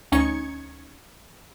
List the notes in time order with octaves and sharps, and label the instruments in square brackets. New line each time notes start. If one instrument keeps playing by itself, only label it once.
[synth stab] D2 C#4 D#4 C#6 G#6 C#7